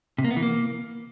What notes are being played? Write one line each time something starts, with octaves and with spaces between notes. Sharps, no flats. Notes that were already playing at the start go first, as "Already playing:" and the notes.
C3
A#3
B3
E3
A#3